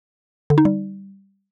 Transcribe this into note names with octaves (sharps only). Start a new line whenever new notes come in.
D3
D#4
G3